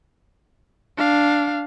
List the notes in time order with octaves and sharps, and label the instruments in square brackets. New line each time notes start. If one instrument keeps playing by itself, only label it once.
[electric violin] D4 F5